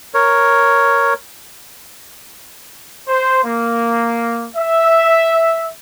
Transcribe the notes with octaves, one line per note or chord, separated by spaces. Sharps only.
A#4 C#5
C5
A#3
E5